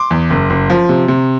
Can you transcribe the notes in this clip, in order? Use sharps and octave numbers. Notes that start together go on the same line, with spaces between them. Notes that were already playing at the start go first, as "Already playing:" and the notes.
Already playing: C6 D6
E2
F#1
F#1
F3
C3
C3